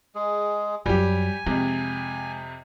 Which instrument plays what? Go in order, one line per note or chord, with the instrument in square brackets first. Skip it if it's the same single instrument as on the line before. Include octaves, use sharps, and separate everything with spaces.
[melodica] G#3 G#4
[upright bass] F#2 F#3 [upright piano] G3 G4 [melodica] G#5
[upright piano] F2 C3 [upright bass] G#3